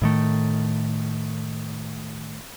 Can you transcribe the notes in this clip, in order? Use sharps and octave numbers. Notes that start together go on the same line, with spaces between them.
A2 D#3 A3